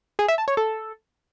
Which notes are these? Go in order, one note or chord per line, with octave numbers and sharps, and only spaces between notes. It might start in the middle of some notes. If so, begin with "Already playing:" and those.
G#4
E5
A5
C#5
A4